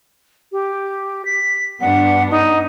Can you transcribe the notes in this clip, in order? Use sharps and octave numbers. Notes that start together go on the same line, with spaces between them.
G4
B6
G2 B3 D4 F#5
D#4